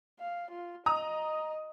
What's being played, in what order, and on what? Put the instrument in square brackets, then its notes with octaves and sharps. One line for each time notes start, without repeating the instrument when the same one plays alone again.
[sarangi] F5
F4
[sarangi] D#5 [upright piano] A#5 D#6